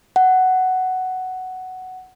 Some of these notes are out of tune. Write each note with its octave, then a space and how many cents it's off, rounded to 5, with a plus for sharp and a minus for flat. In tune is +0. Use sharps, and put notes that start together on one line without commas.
F#5 +5